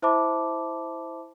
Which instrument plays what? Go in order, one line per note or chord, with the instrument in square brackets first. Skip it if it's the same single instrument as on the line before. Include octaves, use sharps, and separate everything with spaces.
[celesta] E4 C5 E5 A5 B5 D6